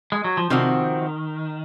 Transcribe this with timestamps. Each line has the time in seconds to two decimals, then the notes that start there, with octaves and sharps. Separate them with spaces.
0.12 G#3
0.24 F#3
0.37 F3
0.50 C3 D#3 F3 C4 F#4